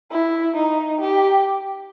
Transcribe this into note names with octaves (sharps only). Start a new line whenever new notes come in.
E4
D#4
G4